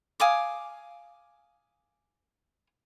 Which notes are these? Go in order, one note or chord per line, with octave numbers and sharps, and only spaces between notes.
F5 G#5 D6 D#6